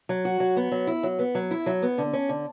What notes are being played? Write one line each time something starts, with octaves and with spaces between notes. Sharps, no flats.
F#3
F#4
F#3
B3
F#3
E4
F#3
B3
F#3
E4
F#3
B3
D3
C#4
D3